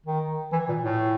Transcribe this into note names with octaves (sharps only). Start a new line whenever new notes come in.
D#3
E3
A#2
A2